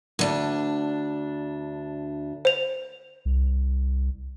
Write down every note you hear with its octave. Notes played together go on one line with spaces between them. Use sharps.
D2 D4
C5 F7
C2